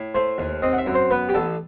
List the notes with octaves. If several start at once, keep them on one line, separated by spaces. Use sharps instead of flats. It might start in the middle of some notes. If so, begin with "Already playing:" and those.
Already playing: A2
A3 C5
D#2
C4 D#5
F#5
E5
F#2
C5
B3 B4
G4
A1 A4